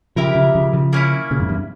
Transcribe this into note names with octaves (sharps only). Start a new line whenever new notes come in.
C#3 F3 E4 G4 A#4
C#3 F3
C#3 F3
C#3 F3
A#3 C#4 E4
A#2 C#3
F2 G#2
E2 G2